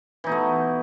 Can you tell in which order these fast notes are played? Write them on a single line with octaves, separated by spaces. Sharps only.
E3 D#4 B2 A3